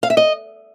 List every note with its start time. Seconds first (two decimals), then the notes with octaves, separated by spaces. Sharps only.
0.03 F5
0.10 E5
0.17 D#5